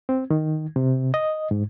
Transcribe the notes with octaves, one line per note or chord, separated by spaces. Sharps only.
C4
D#3
C3
D#5
G#2